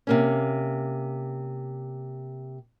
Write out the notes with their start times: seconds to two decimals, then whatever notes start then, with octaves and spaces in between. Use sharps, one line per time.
0.07 C3 A#3 C#4